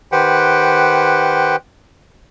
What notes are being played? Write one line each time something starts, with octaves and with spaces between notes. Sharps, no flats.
D#3 G4 B4 C5 F#5 G5